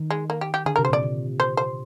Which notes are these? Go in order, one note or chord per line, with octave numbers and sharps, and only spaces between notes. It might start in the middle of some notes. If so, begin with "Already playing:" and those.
Already playing: D#3
G#3
A#3
G4
G4
D3 G#4
A#4
C3
C5
A#2 D5
C3
C5
C5